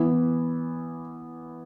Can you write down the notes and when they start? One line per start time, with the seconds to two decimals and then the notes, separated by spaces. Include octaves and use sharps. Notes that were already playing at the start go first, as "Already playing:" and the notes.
Already playing: E3 B3 E4